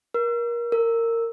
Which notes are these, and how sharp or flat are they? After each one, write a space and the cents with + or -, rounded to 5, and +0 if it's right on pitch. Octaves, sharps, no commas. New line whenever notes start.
A#4 +25
A#4 -20